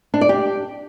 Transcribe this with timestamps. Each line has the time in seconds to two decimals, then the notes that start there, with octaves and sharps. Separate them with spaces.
0.14 D4
0.21 D5
0.29 G4